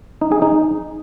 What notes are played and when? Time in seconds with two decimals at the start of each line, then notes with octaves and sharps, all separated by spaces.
0.21 D#4
0.32 G#4
0.42 D#4